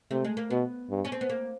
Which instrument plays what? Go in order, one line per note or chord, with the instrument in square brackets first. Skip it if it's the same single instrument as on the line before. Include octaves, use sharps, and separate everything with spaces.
[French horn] C3 [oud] A3
[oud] G#3
A#3
[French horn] B2 [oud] B3
[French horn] G2
[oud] C#4
C4
B3
A#3